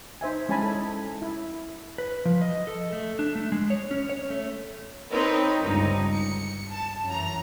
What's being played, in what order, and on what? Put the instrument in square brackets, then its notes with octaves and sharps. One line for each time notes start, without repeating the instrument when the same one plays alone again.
[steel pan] D#4 C5 E5 G#5
G#3 C#4 E4 G#5 A5 B5
A4
E4
[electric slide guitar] B4
F3
D#5
A4
A3
D4
A3
G#3
C#5
C#4
C#5
A3
[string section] C4 D#4 A#4 B4 C#5
G1 C#2 G2 D#4
C#7
A5
F#2 E3 A#5